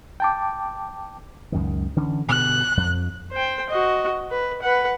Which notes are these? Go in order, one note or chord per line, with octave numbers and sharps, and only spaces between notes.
G5 A5 D6
C#2 F#2 D#3
D3 E3 C#4
G2 B2 D3 F#6
F2
C5 G5
F#4 D#5
B4
B4 F#5